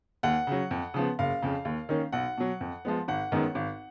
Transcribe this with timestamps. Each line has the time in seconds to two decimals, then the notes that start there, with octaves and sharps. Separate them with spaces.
0.23 D#2 F#5
0.47 C#3 F#3
0.71 F2
0.94 C#3 F3 B3
1.19 F#1 F5
1.42 F2 C#3
1.65 D#2
1.89 D#3 A#3 C#4
2.12 B1 F#5
2.37 B2 F#3
2.61 F2
2.85 F3 G#3 B3
3.08 G#1 F#5
3.32 F#2 D#3 G#3 B3
3.55 G#1